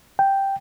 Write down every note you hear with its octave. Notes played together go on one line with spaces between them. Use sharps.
G5